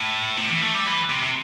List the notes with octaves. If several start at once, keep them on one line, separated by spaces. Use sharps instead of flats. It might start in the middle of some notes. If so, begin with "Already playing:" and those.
Already playing: A2
C3
E3
A3
G3
E3
C3
C3